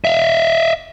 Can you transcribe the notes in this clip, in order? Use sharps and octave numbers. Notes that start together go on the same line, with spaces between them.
E5 F5